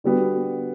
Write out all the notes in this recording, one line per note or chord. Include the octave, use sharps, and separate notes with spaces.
D3 G3 B3 F#4